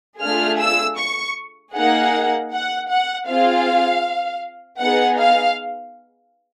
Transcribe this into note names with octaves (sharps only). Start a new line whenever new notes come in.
A3 D4 F4 G#4 F6
E6
C#6
A#3 D#4 G#4 F#5
F#5
F#5
C4 F4 G#4 F5
B3 D#4 G#4 F#5
F5